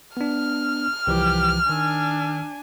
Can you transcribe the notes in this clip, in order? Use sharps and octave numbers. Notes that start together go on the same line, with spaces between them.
B3 D4 F6
C2 E3 F3 G4
D#3 D4 G#5 E6